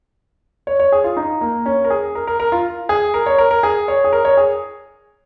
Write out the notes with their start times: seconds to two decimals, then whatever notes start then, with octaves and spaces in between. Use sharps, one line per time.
0.67 C#5
0.79 C#5
0.92 G#4
1.04 F4
1.17 D#4
1.41 A#3
1.66 C#4
1.84 A#4
1.90 G#4
2.15 A#4
2.27 A#4
2.40 A#4
2.52 F4
2.89 G#4
3.14 A#4
3.26 C#5
3.38 A#4
3.51 A#4
3.63 G#4
3.88 C#5
4.04 G#4
4.13 A#4
4.25 C#5
4.37 G#4